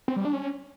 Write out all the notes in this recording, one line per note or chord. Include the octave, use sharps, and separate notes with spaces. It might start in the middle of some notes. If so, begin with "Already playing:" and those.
C4
G3
D4
C#4